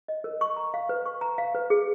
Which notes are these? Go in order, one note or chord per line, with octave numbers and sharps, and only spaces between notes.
D#5
A#4
C#6
A#5
F5
B4
C#6
A#5
F5
B4
G#4